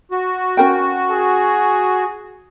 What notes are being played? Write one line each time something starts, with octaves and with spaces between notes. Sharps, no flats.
F#4
C#4 A#4 G5
G#4